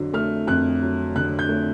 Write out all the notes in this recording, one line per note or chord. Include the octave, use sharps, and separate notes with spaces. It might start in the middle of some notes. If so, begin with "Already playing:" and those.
Already playing: F2 D3 F#3
A3 F6
F2 F#6
F#3
D3 F#6
G6
A3